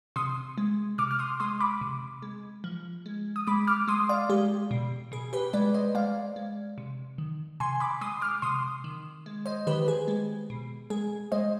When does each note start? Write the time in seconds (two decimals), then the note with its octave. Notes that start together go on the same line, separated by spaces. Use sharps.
0.16 C3 C6 D#6
0.58 G#3
0.98 C3 D6 F6
1.11 F6
1.19 C6 D#6
1.40 G#3 C6 D#6
1.60 B5 D6
1.81 C3
2.22 G#3
2.64 F3
3.06 G#3
3.36 D#6
3.47 G#3 B5 D6
3.67 D6 F6
3.88 G#3 C6 D#6
4.09 D5 F5
4.29 G#3 G4
4.71 B2
5.12 B2 G#4
5.33 G4 B4
5.53 G#3 B4 D5
5.74 C5 D#5
5.95 G#3 D5 F5
6.36 G#3
6.78 C3
7.18 D#3
7.60 C3 G#5 C6
7.80 B5 D6
8.01 G#3 C6 D#6
8.22 D6 F6
8.42 C3 C6 D#6
8.84 D#3
9.26 G#3
9.46 C5 D#5
9.67 D#3 G4 B4
9.88 G#4
10.08 G#3
10.50 B2
10.90 G#3 G#4
11.32 G#3 C5 D#5